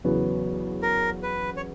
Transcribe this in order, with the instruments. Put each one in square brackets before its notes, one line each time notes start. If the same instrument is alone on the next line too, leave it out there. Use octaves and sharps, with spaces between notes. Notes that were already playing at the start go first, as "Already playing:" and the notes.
[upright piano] E2 C#3 F#3 B3
[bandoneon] A#4
B4
C#5